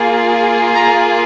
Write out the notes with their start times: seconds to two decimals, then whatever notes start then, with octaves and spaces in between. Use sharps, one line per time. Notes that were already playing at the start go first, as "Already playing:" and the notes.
Already playing: A#3 F4 G#4
0.74 A#5